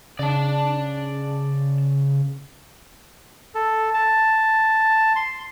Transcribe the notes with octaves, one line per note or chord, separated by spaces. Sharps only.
C#3 D5 A5
A4
A5
C6